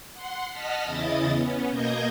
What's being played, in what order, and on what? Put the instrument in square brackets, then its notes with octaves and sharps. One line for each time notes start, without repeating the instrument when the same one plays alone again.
[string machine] F#5 C6
D#5 F#5 A5 F6 B6
E2 C#3 E4 D#5 D#6 A6
B3 C#4
B2 A#3 D#5 G6 G#6 A#6